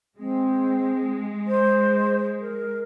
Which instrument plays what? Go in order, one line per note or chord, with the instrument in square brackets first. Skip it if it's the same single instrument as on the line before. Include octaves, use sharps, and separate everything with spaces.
[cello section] G#3 [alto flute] C4
[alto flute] C5
A#4